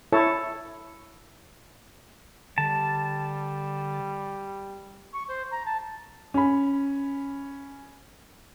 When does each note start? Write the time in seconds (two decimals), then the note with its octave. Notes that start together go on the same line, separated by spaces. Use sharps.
0.12 E4 A4 C#5 A5
2.58 D3 G3 A5
5.13 C#6
5.28 C5
5.51 A#5
5.66 A5
6.34 C#4 B5